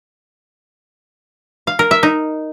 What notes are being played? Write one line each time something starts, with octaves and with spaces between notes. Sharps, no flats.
F5
A#4
E5
D#4